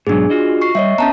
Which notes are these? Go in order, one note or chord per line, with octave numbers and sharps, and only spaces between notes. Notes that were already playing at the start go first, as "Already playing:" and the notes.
G#2 B2 F#3 D4 G#4
F4 F#4 D#5
C#6 C7
G3 C#5 D#5 E5
B3 C#4 A5 A#5